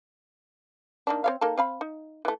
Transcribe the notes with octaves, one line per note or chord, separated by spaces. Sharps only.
D#3 A#3 D4
C4 C#5 F5
A#3 D#4 A4
C4 F5 B5
D#4
E3 A3